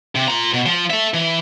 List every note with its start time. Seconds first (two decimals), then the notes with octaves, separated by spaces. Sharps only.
0.15 C3
0.28 F4 A#5
0.54 B2
0.66 F3 F4
0.90 A4 E5
1.14 E3